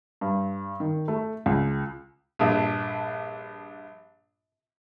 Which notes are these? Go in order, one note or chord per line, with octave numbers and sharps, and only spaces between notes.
G2
D#3
A3
C#2
A#1 G2